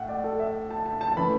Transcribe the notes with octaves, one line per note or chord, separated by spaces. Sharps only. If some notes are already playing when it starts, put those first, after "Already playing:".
Already playing: A2 F#5
D5
A4
E5
A5
A5
A5
A5
E3 A3 C#4 B5